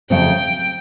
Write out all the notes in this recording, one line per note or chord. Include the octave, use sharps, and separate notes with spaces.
F2 C#3 F#3 A3 C4 G5